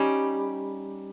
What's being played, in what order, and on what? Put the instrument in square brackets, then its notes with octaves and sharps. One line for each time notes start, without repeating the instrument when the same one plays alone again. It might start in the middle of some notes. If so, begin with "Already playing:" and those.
Already playing: [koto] G3 C#4 D#4